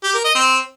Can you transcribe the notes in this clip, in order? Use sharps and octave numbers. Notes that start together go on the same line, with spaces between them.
G4
A#4
D#5
C4